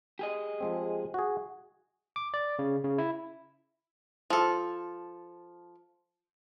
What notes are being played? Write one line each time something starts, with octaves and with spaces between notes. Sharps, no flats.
G4 G#4 D#5
F3 G#3 C4
F#4 G#4
D6
D5
C#3
C#3
E4
F3 A4